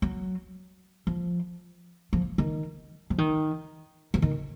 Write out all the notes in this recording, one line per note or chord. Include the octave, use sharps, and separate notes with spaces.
F#3
F3
F3
D#3
F3
D#3
F3
D#3